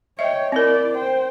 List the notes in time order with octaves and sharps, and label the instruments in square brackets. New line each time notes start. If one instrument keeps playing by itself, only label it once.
[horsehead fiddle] C#5 G5 [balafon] D#5 E5
[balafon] C4 A#4 [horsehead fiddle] E4 D5
[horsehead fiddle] C5 G5